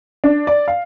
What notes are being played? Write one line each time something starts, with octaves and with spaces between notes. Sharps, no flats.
D4
D5
F5